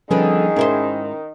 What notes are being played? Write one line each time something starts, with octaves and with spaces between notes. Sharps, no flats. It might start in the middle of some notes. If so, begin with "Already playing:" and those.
D3 D#3 F3 G3 B3 C#4 G#4
G#2 C#4 E4 A#4 C5